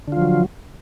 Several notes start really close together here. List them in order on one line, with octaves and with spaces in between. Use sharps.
D3 F4 F3 F#3